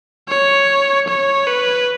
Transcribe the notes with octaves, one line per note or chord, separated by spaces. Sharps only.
C#5
C#5
B4